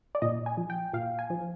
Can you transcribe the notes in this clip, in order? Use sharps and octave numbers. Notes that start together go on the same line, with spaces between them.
D5
A#2 D#5
G#5
F3
G5
A#2 F5
G#5
F3